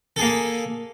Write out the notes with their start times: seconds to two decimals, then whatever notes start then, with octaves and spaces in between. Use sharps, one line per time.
0.16 A4
0.19 G#4
0.22 A#3